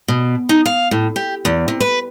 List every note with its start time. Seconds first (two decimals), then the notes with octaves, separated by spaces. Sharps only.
0.08 B2
0.49 D#4
0.66 F5
0.91 A2
1.16 G4
1.45 E2
1.68 C3
1.80 B4